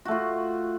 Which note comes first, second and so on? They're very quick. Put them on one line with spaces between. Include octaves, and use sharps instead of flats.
F#4 A3 F4